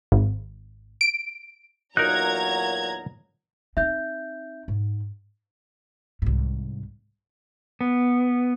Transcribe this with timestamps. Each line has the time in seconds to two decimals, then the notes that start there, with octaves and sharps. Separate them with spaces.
0.12 G#1
1.01 D7
1.97 E2 A#2 F#3 D#4 A#4 A#5 F#6 G#6
3.77 C4 D#4 E5 G6
4.68 G#2
6.22 C2 G#2
7.81 B3